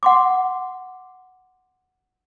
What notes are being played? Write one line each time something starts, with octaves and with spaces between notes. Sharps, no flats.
F#5 C6 D6